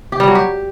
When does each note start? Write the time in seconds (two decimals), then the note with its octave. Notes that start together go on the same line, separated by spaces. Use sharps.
0.12 G4
0.20 G3
0.28 F#3
0.35 G4